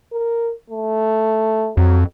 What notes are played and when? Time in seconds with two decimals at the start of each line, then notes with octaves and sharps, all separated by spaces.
0.12 A#4
0.70 A3
1.77 F2 F#3